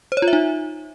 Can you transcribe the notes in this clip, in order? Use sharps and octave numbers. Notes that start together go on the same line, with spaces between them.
C5
C#5
F4
E5
D#4